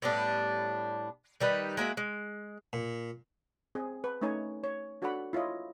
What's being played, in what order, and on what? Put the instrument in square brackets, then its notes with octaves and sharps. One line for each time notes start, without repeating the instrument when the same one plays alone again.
[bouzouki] A2 G3 B3 D4
D#3 G3 D#4 B4
G#3 A#3 F#4 E5
G#3
[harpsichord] A#2
[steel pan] C4 G#4
B4
A3 C#4 D#4 C#5 G#5
C#5
D4 F#4 A4 D5 F#5 B5
E4 F4 C#5 D#5